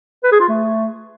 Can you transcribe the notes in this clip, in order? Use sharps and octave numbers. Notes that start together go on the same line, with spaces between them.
B4
G#4
F4
A3